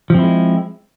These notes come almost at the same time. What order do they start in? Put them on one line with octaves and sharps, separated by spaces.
F3 C4 E4 G#3